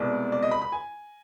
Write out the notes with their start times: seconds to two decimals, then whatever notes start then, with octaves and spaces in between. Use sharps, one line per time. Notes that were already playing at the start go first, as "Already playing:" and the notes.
Already playing: C2 B2 G#3 D5
0.32 D5
0.42 D#5
0.51 B5
0.62 B5
0.72 G#5